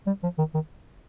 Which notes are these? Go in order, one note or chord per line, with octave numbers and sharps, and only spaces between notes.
G3
F3
D#3
D#3